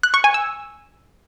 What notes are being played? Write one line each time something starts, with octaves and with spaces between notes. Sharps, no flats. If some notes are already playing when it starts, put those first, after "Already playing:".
F#6
C#6
G#5
E6